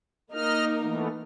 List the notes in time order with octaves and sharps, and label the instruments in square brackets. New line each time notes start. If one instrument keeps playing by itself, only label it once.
[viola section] A#3 D#4 A#4 [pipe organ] D#5 F6
[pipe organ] E3 A3 B3